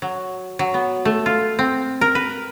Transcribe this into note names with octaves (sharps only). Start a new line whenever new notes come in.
F#3
F#3
B3
A3
F4
C4
A#4
B4